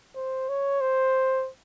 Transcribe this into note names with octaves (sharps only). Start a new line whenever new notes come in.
C5
C#5
C5